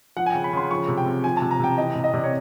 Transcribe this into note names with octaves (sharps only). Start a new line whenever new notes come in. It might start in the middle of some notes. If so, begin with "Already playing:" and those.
F3 F#5
G#5
C#3 G5
B5
C#3 C6
F3 C#6
C3
G5
C3
F3 G#5
C3 A5
A#5
C3 G5
E3 D#5
C3
D#5
C3 D5
C#5